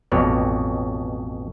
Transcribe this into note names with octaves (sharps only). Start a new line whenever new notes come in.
A1 F2 B2 C#5 D5